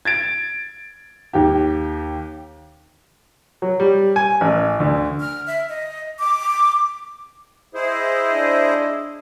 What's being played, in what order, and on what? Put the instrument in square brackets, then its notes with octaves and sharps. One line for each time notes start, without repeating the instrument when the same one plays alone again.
[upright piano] G#6 A6 D7
D#2 G4
[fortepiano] F#3
G3
G#5
A1
D2
[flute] F6
E5
D#5
D6
[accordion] E4 G#4 C5 [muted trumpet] D#5 [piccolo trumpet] E5
[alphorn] D4